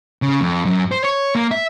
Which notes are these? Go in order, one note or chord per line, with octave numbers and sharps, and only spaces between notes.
C#3
F2
F#2
C5
C#5
A#3
E5